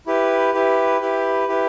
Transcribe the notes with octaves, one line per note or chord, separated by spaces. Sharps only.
E4 G4 B4
E4 G4 B4
E4 G4 B4
E4 G4 B4